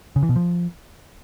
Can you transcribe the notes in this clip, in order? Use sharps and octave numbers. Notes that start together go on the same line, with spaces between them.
C#3
E3
B2
F3